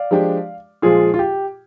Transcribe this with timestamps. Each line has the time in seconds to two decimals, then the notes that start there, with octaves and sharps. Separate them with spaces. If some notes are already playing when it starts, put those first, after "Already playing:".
Already playing: D5 F5
0.11 F3 G#3 D4 G4
0.82 A#2 F3 G#3 F4 G#4
1.14 F4
1.19 G4